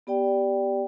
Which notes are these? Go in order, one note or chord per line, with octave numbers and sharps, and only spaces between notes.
B3 G4 D5 G5